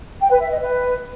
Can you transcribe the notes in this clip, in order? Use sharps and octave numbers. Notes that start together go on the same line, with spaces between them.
G5
B4
E5
D#5
B4